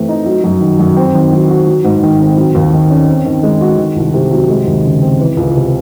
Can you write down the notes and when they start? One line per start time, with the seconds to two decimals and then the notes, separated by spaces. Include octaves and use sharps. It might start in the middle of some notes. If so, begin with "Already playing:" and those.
Already playing: E3 A3 C4
0.09 D#4
0.26 F#3
0.44 F#2
0.61 D#3
0.79 F#2
0.97 C4
1.14 D#3
1.32 F#3
1.49 F#4
1.67 F#3
1.84 G#2
2.03 D#3
2.20 C4
2.37 F#3
2.55 D#2
2.73 D#3
2.90 C#4
3.08 C4
3.26 D#3
3.43 G#3
3.61 F#4
3.78 D#3
3.96 C2
4.14 C3
4.31 F#3
4.49 G#3
4.67 D#2
4.84 C#3
5.02 C4
5.19 E3
5.37 C#2
5.55 C3